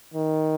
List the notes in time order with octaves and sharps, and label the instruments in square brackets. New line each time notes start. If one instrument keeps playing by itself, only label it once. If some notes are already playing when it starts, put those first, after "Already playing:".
[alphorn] D#3